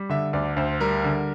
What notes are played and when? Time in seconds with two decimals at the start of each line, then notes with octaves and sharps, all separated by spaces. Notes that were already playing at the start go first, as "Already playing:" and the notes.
Already playing: G3
0.09 D3 E5
0.33 D2 D5
0.56 D2 C5
0.80 G3 A#4
1.04 D3